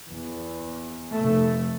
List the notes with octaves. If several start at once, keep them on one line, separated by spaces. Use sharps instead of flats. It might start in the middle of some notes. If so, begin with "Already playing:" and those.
E2
F1 A3